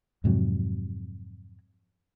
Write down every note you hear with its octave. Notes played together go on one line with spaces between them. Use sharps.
F2 G#2 C3 F#3